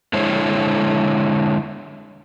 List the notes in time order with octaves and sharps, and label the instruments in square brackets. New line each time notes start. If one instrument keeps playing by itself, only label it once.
[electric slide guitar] D3 G#3 E4 C5 C#5